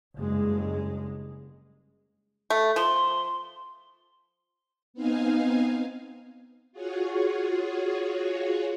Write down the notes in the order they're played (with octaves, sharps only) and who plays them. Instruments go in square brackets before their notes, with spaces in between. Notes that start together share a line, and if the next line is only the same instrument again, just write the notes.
[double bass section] F#1 G2 G#3
[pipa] A3
[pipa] F3 [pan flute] C6
[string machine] B3 C4 D#4 F5 G#5
F4 F#4 G#4 C#5